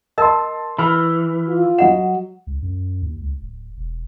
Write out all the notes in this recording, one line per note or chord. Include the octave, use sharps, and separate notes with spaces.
A#4 D#5 A5 C6 E6
E3 B5 F6
F4
F#3 D#5 F#5 E7
C#2
F#2
D#2
C#2
D1
E1